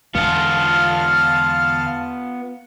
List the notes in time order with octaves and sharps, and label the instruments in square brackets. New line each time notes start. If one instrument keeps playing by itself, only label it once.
[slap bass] E2 D3 G#3 [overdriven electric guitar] B3 F4 [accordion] F5 A5 F6